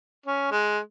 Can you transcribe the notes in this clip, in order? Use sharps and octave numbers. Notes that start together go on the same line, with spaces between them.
C#4
G#3